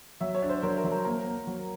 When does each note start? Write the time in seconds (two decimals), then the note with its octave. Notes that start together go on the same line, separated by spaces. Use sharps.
0.21 F#3 E5
0.35 C#5
0.42 D4
0.49 C5
0.63 F#3 A#4
0.78 A#4
0.84 F#3
0.92 A#4
1.05 A#3 A#4
1.27 A#3
1.47 F#3